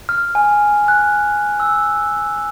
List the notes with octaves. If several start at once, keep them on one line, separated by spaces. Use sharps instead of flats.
F6
G#5
F#6
E6